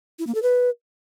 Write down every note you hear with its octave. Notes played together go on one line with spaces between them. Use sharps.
E4
A#3
A4
B4